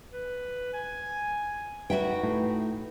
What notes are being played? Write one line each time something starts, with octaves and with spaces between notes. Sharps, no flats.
B4
G#5
D#4 F#4 B4 E5 G5
A2